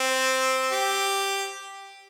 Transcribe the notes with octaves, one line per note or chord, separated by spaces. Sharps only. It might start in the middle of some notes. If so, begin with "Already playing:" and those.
Already playing: C4
G4